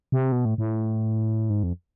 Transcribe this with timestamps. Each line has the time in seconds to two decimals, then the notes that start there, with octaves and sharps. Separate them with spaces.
0.12 C3
0.32 B2
0.45 A2
0.58 A2
1.50 G#2
1.63 F2